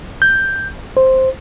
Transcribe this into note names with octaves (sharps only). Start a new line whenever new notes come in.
G6
C5